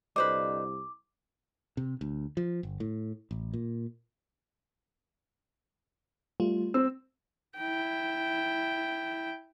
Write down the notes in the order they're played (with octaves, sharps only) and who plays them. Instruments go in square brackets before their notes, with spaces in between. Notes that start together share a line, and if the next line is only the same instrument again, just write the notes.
[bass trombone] C2 [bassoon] D3 [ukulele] B4 C5 D#5 [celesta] D6
[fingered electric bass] C3
D2
F3
G1
A2
A1
A#2
[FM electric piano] G3 A3 F4
[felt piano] C4 [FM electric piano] E6
[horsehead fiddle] E4 G5